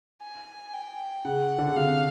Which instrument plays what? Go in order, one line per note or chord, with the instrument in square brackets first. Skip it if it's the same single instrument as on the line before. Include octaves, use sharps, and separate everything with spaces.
[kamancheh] G#5
G5
[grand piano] C#3 [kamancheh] F#5
[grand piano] D3
C#3
[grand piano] C3 [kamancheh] F5